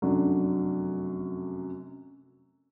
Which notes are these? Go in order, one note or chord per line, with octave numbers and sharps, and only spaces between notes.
F1 F#2 F#3 D4 A4